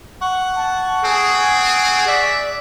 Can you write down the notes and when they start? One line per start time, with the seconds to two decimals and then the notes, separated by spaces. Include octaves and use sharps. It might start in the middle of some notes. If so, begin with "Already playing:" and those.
0.21 F#5 C#6
0.57 A5
1.05 C4 G#4
2.08 D5 E5